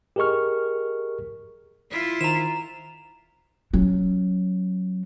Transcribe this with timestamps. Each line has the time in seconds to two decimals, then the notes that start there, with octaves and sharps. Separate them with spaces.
0.16 G4 G#4 A#4 D#5 C#6 F6
1.90 E4 F4
2.21 D#3 C5 A#5 E7
3.73 F#3 C#4